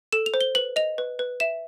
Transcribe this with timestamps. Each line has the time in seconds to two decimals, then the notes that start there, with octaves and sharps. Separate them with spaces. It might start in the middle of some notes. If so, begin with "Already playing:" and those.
0.13 A4 E7
0.26 F7
0.34 C5
0.41 G7
0.55 B4 F#7
0.76 D#5 F7
0.98 B4
1.19 B4
1.40 E5 E7